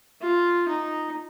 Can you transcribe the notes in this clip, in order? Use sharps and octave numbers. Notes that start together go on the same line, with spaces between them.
F4
D#4